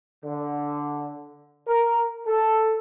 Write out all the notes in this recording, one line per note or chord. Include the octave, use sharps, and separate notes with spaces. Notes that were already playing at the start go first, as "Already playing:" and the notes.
D3
A#4
A4